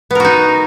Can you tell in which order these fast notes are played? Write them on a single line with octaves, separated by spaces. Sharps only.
B3 A#4 F#4 D#4